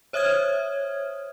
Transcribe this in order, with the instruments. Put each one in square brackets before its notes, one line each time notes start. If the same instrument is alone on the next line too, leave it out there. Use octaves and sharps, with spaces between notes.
[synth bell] C5 C#5 E5 D#6 F6 G#6